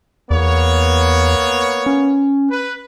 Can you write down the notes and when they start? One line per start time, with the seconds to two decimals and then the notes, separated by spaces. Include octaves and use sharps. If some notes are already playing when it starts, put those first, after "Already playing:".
0.30 E2 A#3 B3 C#5
1.86 C#4
2.51 B4